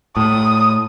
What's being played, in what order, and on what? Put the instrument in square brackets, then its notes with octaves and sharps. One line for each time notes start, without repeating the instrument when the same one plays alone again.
[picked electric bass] A2 [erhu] D#6